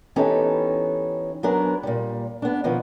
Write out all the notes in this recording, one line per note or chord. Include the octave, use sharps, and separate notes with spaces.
E3 B3 C#4 D#4 G4 A4
F#3 B3 D4 G#4 A#4
A#2 G3
B3 D4
B2 D#3 F3 B3